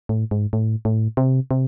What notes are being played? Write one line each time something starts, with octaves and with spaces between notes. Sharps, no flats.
A2
G#2
A2
A2
C3
C3